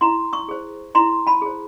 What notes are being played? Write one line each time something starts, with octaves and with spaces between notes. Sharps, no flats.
E4 A#5 C6
C#6 D#6
G#4 C5
E4 A#5 C6
A5 B5
G#4 C5